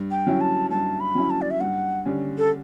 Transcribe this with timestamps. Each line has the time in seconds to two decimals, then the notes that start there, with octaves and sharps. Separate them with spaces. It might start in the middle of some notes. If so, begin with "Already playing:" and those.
Already playing: G2
0.11 G5
0.27 F#3 C#4 E4
0.41 A5
0.71 G2 A5
1.00 B5
1.15 F#3 C#4 E4
1.30 A5
1.42 D5
1.51 E5
1.61 G2 F#5
2.05 D3 G3 C#4
2.38 A4